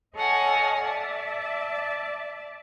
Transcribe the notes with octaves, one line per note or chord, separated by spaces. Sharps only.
A4 C#5 D#5 F5 F#5 G#5
D5 E5 A5